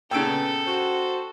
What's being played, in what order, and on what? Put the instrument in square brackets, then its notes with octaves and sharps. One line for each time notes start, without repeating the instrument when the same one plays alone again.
[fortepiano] A#2 C#3 [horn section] B3 [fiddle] A4 [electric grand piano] G5 E6 D7
[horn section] F#4 C5